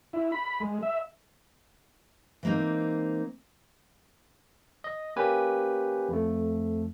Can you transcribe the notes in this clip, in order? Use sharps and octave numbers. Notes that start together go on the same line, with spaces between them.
E4
B5
G#3
E5
E3 G#3 A#3 C4 D#4
D#5
A#3 C#4 G4 B4 G#5
F2 A3